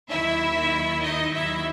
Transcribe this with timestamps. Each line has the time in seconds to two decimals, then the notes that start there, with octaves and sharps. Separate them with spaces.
0.10 D#2 D#3 F#3 E4 E5
1.03 D#4 D#5
1.34 D#2 D#3 F#3 E4 E5